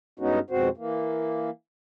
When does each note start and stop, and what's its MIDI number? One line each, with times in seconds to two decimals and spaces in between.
0.20 0.39 43
0.20 0.39 56
0.20 0.39 59
0.20 0.39 61
0.20 0.39 63
0.20 0.39 66
0.50 0.69 41
0.50 0.69 44
0.50 0.69 47
0.50 0.69 60
0.50 0.69 66
0.50 0.69 72
0.77 1.50 52
0.77 1.50 58